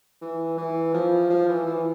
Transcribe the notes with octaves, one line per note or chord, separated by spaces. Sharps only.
E3
E3
F3
F3
E3
E3